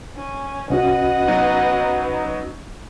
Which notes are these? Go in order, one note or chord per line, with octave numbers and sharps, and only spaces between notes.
C#4
C2 C#4 F#4 B4 D#5 F#5
F#3 B3 D#4